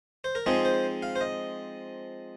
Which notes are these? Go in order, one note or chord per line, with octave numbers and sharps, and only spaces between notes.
C5
A#4
F3 G#3 C4 D#4 G#4
C5
F5
C5
D#5